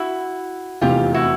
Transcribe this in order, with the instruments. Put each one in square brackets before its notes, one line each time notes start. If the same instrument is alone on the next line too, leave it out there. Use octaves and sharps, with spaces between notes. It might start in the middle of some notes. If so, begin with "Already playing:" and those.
Already playing: [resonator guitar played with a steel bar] E4 F#4
[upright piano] F1 E2 C3 E3 A3 [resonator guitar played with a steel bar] F4 G4
[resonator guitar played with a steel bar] E4 F#4